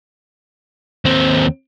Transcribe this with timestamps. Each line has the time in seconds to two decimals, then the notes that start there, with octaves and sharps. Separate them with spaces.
1.05 D#2 C4